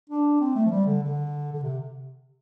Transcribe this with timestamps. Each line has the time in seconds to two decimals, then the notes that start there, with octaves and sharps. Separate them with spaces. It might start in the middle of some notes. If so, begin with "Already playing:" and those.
0.09 D4
0.40 C4
0.55 A3
0.66 F3
0.70 G3
0.86 D3
1.02 D3
1.52 D3
1.63 C3